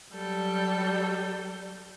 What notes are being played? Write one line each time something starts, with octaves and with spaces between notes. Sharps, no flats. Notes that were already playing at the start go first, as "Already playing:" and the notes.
F#3 G3 A4 G6